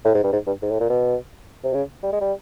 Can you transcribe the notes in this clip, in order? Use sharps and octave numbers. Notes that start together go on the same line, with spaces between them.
A2
G#2
G2
G#2
G2
G#2
A2
A#2
B2
C3
C#3
G3
G#3
G3